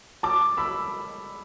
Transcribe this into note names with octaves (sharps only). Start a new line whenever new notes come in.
A5 D6
B5 E6